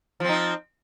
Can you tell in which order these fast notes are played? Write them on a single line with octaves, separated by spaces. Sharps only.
F3 C4 D#4